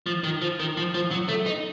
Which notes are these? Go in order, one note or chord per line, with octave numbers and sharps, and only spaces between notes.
F3
D#3
F3
D#3
F3
F3
F#3
A3
D#4